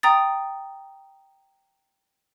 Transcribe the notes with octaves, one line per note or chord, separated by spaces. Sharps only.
G5 A#5 D#6 A6